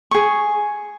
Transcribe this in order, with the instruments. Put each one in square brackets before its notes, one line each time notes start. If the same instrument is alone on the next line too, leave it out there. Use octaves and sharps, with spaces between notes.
[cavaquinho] G#4 C#6